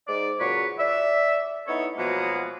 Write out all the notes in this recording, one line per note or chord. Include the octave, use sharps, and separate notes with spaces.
G#2 D5
A#2 C#3 F#3 B4 C#5
D5 E5
B3 D#4 E4 A4 C#5
B2 F3 F#3 G#3 A#3 B3